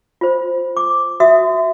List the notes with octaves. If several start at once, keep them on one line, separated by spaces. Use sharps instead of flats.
F4 C5
D6
F#4 E5 D#6